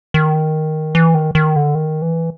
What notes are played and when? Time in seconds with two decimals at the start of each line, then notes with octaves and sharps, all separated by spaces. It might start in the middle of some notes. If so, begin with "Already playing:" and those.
0.14 D#3
0.95 E3
1.15 D#3
1.35 D#3
1.56 D3
1.75 D#3
2.02 E3